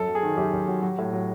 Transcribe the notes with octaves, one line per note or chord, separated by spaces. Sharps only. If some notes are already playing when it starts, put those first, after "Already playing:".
Already playing: F#2 A4
F#3
G#4
D#3
F#2 G4
F#2
F#3
F#3
A2
F#3